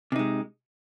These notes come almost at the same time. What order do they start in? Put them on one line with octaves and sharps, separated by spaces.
C3 D#4 G#3